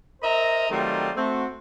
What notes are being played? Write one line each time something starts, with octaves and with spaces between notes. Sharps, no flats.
A#4 C5 D#5 E5 A#5
D#3 F#3 G3 A3 C4 F4
A3 C4 F#4